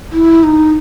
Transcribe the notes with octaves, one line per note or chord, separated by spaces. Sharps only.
E4
D#4